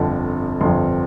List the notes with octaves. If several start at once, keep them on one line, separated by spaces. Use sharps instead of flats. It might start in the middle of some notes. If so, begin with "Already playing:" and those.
Already playing: G1 F2 D3 F3 A5
G1 F2 D3 F3 C6